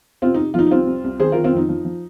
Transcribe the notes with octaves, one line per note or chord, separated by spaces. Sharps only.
C3 C4 F4
C3 D#4
F3 D#4 F4
D#4
C2 C4 F4
C2
C2
D#3 G#4 C5
D#3 F4 A#4
C4 F4
F2 D#4
F3
F3